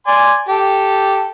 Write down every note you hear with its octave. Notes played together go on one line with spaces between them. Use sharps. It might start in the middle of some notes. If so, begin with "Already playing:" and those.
D5 G#5 C6
G4 A4